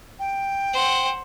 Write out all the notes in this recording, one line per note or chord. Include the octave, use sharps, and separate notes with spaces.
G5
C5 F#5